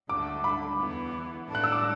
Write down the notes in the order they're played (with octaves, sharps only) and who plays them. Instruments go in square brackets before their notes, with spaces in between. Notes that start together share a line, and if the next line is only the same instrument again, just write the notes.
[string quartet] D2 D3 A3 [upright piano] D6
[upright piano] B5
[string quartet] E2 E3 B3
A2 A3 D4
[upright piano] F#6
E6
D6